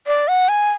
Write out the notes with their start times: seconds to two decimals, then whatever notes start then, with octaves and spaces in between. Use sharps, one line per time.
0.07 D5
0.28 F#5
0.49 G#5